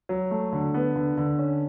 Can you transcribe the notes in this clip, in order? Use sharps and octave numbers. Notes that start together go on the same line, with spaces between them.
F#3
A3
D3
B3
D3
D3
C#4